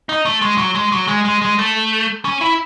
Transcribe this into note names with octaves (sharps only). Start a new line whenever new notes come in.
D#4
A3
G#3
F#3
G#3
F#3
G#3
G#3
G#3
A3
C#4
E4